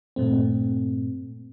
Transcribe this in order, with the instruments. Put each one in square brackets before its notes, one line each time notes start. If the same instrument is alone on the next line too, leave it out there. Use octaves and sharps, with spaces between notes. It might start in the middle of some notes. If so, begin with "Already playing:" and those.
[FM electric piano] G2 A#2 A3 C4